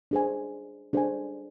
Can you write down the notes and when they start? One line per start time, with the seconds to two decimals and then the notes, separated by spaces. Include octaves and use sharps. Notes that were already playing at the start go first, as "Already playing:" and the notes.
0.11 D4 G#4 C5 G#5
0.93 D4 G#4 C5 G#5